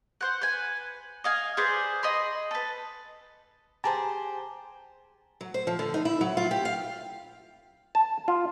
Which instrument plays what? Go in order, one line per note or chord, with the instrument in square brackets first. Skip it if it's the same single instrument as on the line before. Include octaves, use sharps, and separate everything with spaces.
[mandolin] C5 F#5
B4 G#5
D#5 F5 G#5
G#4 B4 C5 D5
D#5 B5 C6
A4 B4
[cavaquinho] G4 G#4 C5 [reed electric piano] A5 A#5
[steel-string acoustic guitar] F#3
C5
F3
D3
D#4
E4
F#3
F4
G4
F5
[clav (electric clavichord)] A5
F4